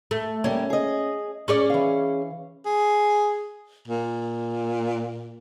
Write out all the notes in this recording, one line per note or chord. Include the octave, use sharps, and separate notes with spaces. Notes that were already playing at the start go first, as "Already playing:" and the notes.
A3
G3 A#3 C#4
G#4 D#5
C#4 G#4 D5
E3 F5
G#4
A#2